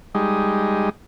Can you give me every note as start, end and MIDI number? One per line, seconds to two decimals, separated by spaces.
0.15 0.89 55
0.15 0.89 56
0.15 0.89 63